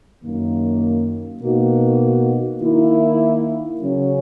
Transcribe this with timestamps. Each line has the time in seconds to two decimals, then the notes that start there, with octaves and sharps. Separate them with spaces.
0.23 F#2 D#3 A#3
1.42 B2 A#3 D#4 F#4
2.61 D#3 A#3 E4
3.80 C#3 F#3 C#4